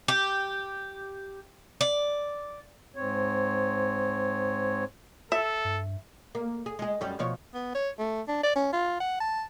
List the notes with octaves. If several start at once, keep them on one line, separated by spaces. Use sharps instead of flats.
G4
D5
G#2 C4 C#5
A4 E5
G2
A#3
G#4
G#3 G#4
F#2 G3 C#4
B2 F3 C#5
B3
C#5
A3
D4
D5
C#4
F4
F#5
A5